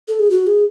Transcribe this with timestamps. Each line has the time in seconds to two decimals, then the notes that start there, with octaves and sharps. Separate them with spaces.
0.08 A4
0.19 G#4
0.30 F#4
0.47 G#4